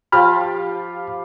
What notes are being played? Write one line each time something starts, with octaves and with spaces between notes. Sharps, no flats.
F3 F4 G4 B5 F6